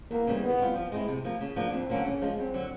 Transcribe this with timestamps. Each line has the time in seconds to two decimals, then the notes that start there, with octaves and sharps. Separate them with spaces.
0.11 E2 A#3
0.27 C#3 E3 G3 C4
0.43 D#3 B3
0.59 G3 C4 F4
0.75 F3
0.92 G#3 C4 E4
1.08 C3
1.24 F3 A#3
1.41 C#3
1.56 F3 A#3 D4
1.72 F2 C4
1.89 D3 F#3 A#3 C#4
2.05 C#3 C#4
2.21 F3 G#3
2.38 F#2 C4
2.54 D3 F#3